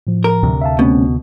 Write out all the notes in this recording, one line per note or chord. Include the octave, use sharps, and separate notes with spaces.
A2 F3
A#4
D2 C3
E5 F5 A5
B2 A3 C4 C#4